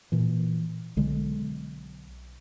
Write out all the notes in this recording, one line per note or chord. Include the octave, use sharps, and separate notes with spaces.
A#2 E3
B1 D3 G#3